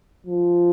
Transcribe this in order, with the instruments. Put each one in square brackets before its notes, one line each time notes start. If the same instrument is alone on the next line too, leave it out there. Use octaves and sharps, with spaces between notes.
[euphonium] F3